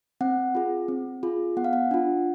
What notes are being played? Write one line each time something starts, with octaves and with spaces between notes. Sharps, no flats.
C4 F#5
F4 G#4
C4
F4 G#4
B3 F#5
F5
F#5
D4 F4